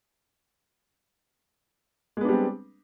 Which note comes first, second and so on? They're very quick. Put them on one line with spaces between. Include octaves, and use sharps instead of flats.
G#3 B3 D4 G3 C4